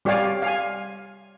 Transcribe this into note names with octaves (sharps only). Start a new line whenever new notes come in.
G3 G4 C#5 D5 F5 G#5
F5 G#5